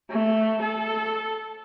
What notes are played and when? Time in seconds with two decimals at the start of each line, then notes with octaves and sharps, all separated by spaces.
0.11 A3
0.62 A4